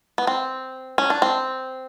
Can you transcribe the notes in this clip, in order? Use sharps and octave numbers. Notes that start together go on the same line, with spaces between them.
B3
C4
C#4
D4
C4